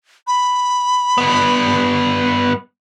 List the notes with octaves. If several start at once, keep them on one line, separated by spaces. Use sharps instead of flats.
B5
G2 B3